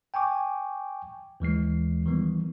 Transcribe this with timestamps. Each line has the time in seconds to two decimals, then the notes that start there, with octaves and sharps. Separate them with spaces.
0.14 G5 G#5 C#6 D6
1.40 D#2 E3 G#3 C7
2.06 D#3 E3 G3 B3